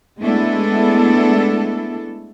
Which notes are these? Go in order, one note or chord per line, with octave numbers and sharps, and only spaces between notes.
G#3 A3 B3 D4 E4 A4